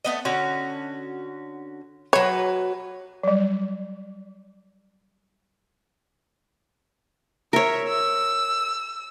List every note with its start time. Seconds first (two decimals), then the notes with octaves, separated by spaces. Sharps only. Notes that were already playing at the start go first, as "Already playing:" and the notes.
0.05 A3 B3 D#5
0.25 D3 C#4 F#4
2.13 F#3 B4 C#5
3.23 F#3 G3
7.53 A#4 C#5 E5
7.88 E6